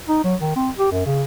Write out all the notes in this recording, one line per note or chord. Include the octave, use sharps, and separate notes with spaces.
D#4
F#3
D#3
C4
G4
F#2
C#3